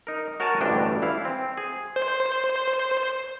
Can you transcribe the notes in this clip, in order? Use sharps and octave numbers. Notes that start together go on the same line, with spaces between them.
D#4 A#4
F#4 A#4 C#5 F#5 G#5 A5
A1 D2 G2 B2 D4 G5
E3 E4 F5
C4
G#4
C5